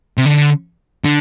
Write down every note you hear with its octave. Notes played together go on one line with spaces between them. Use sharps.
C3
D3
D3